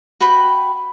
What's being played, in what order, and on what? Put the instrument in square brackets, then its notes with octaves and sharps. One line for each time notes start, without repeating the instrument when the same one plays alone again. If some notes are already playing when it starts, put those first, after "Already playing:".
[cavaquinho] F#4 B4 G5 B5